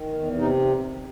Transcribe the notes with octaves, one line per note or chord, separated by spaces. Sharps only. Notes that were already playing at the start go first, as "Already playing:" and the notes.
Already playing: D#3
E2
C3 D#4